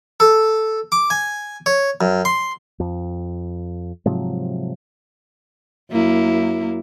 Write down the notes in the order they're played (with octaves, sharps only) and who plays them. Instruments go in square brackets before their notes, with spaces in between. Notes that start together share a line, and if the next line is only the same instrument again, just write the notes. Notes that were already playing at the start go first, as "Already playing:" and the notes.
[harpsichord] A4
D6
G#5
C#5
F#2
C6
[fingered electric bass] F2
G#2 C3 F3 F#3
[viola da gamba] F#2 A#3 E4